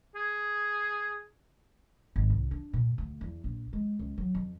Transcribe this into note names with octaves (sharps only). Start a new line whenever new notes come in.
G#4
G#1
C2
D4
A#2
D2
E2
A#1
G#3
C#2
F#3
F2